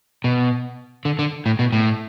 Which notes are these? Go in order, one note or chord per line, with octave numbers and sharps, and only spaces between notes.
B2
D3
D3
A2
B2
A2